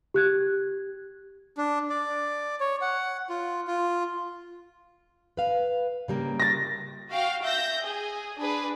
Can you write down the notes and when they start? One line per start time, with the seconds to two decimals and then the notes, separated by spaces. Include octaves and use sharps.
0.14 G4 F#6 G#6
1.58 D4
1.90 D5
2.60 C#5
2.82 F#5
3.30 F4
3.67 F4
5.37 B4 F5
6.08 C#3 G3 A#3
6.40 A6 A#6
7.10 F#4 F5 G5
7.42 E5 G6 A#6
7.81 G#4
8.38 D4 G#4 B4